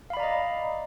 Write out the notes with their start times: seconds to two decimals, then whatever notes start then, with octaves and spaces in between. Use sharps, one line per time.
0.10 F5
0.13 B5
0.17 D5
0.20 A#5
0.23 D#5